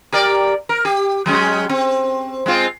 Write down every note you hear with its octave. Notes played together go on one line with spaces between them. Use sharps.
G4 A#4 D5
A#4
G4
F#3 G#3 C#4
C4
G#3 C4 F4